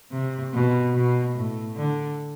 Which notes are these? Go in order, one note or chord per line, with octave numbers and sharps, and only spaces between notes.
C3
B2
B2
A2
D3